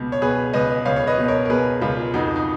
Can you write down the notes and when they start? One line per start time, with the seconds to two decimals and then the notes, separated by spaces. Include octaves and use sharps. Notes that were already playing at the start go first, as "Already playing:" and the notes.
Already playing: C#2 B2
0.12 C#5
0.22 B2 G#4 B4
0.53 C#2 B4 D#5
0.85 C#2 C#5 F5
0.96 C#5
1.07 B4 D#5
1.18 B2
1.28 A#4 C#5
1.45 A#4
1.50 B2 G#4 B4
1.81 C#2 F4
2.14 F2 D#4 F#4
2.36 D#4